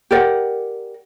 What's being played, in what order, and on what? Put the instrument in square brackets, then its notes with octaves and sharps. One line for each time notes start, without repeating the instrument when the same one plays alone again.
[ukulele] G4 A#4 D5 F#5